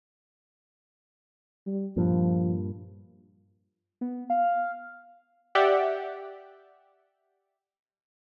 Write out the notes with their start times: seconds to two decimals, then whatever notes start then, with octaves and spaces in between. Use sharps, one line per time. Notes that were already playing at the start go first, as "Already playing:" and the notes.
1.67 G3
1.97 G2 A#2 F3
4.01 B3
4.30 F5
5.55 G4 D5 E5 F#5 G5